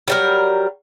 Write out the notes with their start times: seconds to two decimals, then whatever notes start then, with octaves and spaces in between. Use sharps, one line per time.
0.08 F#3 G3 A#4